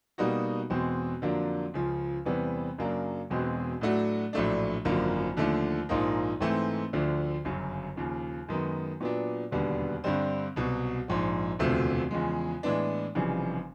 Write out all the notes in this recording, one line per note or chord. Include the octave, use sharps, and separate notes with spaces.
B2 G3 A#3 D#4 F#4
E2 B2 G#3 C4
F2 D3 F#3 A#3 D4
C#2 C#3 F3
E2 C3 E3 G3 B3
F#2 C#3 F#3 A#3 D4
E1 E2 B2 G#3 C4
A2 F#3 A3 D4 F#4
A#1 A2 F#3 A3 D4
G#1 F#2 D3 F3 A#3
D#2 D3 F3 A3
A#1 G#2 F3 A#3 D#4
G#2 E3 A3 C4
D2 D3 F3 A3
G1 F#2 C#3 F#3
D#2 C#3 F3
F#2 D#3 G#3 B3
A#2 F#3 B3 D4
E1 D#2 D3 G3 B3
G2 D3 G3 C4
C2 B2 F#3
A#1 G#2 F3
E1 D2 C3 F3 A3
E2 C#3 F3 G#3
A2 E3 G#3 B3 D4
F1 F2 C#3 E3 G3